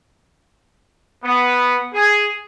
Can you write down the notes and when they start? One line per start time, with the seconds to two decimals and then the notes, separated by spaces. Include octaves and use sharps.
1.24 B3
1.94 G#4